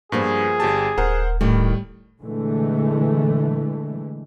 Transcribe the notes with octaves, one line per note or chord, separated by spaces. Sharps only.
G2 F3 A#3 B3 G#4
G1 G4 A5
D#1 A#4 C5 F#5
A2 D#3 G3
A#2 D3 E3 G#3 A3